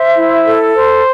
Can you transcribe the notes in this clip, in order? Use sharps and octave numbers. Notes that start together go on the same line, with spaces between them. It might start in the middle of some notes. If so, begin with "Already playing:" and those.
Already playing: C5 E5
E4
A4
C5